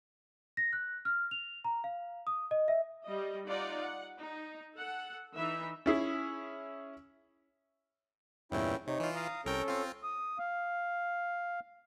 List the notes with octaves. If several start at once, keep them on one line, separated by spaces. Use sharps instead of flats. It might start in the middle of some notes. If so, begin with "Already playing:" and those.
A#6
F#6
F6
F7
A#5
F5
D#6
D#5
E5
G3 D#5
D#4 F4 D5 F#5
F#5
D#4
A4 F#5
E3 D#4 E5
C#4 E4 G#4
E2 G2 A#2 C#4 E4 G5
C3 D#4 C#5
E3 F4
F5 A#5 D#6
C2 C#4 A4 A#4 G5
C4 F4
D#6
F5